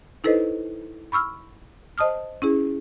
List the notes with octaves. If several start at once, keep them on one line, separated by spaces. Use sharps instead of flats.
D#4 E4 A4 B4 C5 D#5
B5 C#6 E6 F6
C5 D#5 A5 D#6 F6
C#4 E4 G#4